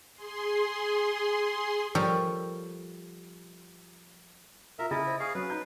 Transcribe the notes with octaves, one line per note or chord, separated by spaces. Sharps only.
G#4 C6
F3 G3 A4 A#4 C#5
F4 A#4 E5
C#3 E4 D#5 G#5 A6
C5
G#4 F5 C#6 D#6
F#3 C#4 B4
D#4 A#5 G6